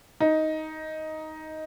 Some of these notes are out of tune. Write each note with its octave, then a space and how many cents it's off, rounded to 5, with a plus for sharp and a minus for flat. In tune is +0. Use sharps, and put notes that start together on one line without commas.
D#4 +10